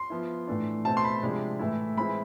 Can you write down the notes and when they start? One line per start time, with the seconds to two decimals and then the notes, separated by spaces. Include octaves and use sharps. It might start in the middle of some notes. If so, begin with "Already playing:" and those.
Already playing: C6
0.10 F3 B3 E4
0.48 A2 E3 A3 D4
0.85 B2 A3 C4 A5
0.97 C6
1.04 B5
1.23 C3 F3 G#3 D4
1.59 A2 E3 A3 E4
1.97 E3 G#3 C4 E4 B5